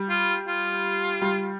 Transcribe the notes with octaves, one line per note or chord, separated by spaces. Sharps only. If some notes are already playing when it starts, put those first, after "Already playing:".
Already playing: G3
F4
F4
G3